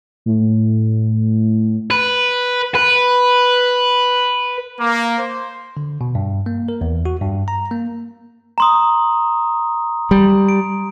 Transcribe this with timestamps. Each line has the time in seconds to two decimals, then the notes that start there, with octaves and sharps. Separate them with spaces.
0.26 A2
1.91 B4
2.75 B4
4.79 A#3
5.19 C5
5.77 D3
6.01 B2
6.15 G2
6.46 A#3
6.69 A#4
6.81 E2
7.06 F#4
7.21 G2
7.48 A#5
7.71 A#3
8.58 A#5 C6 D#6
10.11 G3
10.49 D7